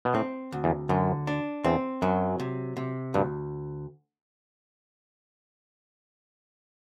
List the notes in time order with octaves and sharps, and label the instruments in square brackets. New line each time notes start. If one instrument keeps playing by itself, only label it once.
[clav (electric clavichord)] B2
[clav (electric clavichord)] A2 [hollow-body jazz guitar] C4
[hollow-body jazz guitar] D2
[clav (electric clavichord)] E2
[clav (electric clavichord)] F#2 [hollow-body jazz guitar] D3
[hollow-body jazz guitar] D4
[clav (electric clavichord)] E2 [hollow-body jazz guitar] C4
[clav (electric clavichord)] F#2 [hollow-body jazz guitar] F#3
[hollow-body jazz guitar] C3
C3
[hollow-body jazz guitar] D2 [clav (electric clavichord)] G2